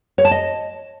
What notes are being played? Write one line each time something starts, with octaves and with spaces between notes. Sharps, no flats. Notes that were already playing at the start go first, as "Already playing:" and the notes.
C#5
A5
D#5